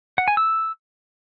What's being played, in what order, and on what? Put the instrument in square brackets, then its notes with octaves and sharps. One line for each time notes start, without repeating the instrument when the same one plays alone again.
[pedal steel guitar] F#5
G#5
E6